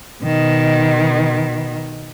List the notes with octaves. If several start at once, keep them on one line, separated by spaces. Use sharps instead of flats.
B2 D#3